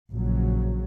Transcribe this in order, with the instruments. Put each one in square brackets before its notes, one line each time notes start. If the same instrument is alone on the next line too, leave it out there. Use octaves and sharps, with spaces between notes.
[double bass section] A#1 C#3 F#3